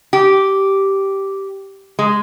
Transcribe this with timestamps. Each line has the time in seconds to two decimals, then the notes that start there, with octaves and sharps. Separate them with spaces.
0.13 G4
1.99 G#3